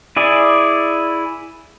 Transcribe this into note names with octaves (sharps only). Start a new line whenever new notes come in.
E4 G#4 D5